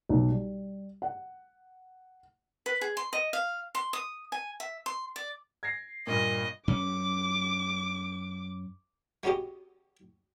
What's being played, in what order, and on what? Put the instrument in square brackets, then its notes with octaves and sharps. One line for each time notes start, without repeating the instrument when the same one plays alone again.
[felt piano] B1
G3
F#5
[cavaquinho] B4
G#4
C6
D#5
F5
C6
D#6
G#5
E5
C6
D5
[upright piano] G#6 A#6 C7
[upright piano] G2 A#2 [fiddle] D#5
[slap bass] F#2 C#4 [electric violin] D6
[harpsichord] G#3 B3 C#4 F#4 G4 D#5